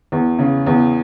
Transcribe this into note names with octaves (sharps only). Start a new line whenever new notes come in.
E2
C#3
E2